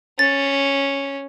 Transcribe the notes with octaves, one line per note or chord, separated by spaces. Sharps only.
C#4 A6